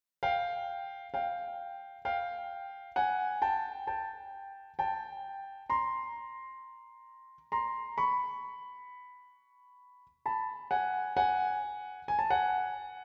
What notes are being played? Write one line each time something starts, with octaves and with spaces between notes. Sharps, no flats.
F5 G5
F5 G5
F5 G5
F#5 G#5
G5 A5
G5 A5
G5 A5
A#5 C6
A#5 C6
B5 C#6
A5 B5
F#5 G#5
F#5 G#5
G#5
A5
F#5 G#5